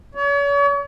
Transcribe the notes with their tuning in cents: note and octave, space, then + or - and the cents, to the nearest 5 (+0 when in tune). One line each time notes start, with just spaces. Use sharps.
C#5 +40